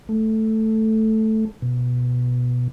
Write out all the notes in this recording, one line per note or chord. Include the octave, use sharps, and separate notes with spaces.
A3
B2